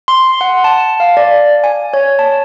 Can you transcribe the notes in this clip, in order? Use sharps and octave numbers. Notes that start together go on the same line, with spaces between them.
C6
F#5
A5
F5
D5
G#5
C#5
A5